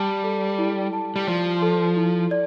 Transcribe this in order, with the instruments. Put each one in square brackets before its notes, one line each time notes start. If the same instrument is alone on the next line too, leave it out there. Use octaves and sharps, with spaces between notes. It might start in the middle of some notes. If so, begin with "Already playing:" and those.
Already playing: [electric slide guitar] G3 [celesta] A5
[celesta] A4
E4
A5
[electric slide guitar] G3
[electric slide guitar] F3 [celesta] D5
[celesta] A4
E4
D5